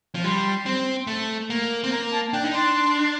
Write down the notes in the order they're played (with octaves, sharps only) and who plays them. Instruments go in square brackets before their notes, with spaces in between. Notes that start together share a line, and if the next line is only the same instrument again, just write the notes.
[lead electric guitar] F3
[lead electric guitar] G3 [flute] C6
[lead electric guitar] C4
A3
A#3
C4
[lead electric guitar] A#3 [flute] A#5
[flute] A5
[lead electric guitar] D4 [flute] G5
[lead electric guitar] D#4
[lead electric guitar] D4 [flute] C6